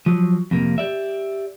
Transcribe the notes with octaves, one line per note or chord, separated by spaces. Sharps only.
F3 F#3
F2 C3 A#3
G4 D5 E5